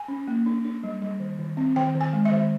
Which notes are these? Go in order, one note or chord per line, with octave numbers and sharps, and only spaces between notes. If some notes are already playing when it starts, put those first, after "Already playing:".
Already playing: G#5
C#4
A#3
D4
D4
G3
G3
D#3
D#3
C4
D#3 G5
D#3
G#5
G#3
E5
D#3